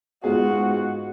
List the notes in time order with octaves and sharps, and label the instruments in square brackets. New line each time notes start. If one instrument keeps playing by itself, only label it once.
[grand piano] G#2 G#3 B3 F4 G#4 [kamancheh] F#4